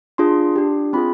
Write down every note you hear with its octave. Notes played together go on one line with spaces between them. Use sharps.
D4 F4 G#4 C6
D4 G4
C4 F4 G#4 B5